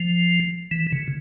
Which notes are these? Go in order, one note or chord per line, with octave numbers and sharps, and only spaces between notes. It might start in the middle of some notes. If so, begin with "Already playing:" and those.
Already playing: F3
E3
C#3